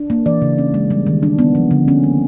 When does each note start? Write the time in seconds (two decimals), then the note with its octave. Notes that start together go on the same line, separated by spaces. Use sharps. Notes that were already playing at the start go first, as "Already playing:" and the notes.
Already playing: D4
0.10 A#3
0.26 E3 D5
0.42 C#3
0.58 C#4
0.74 G#3
0.90 G3
1.07 D#3
1.23 D4
1.39 B3
1.55 F3
1.71 D3
1.88 C#4
2.03 A#3